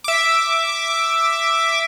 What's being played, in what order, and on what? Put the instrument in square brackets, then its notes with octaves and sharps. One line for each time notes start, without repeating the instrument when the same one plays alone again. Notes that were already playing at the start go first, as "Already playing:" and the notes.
[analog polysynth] E5 D6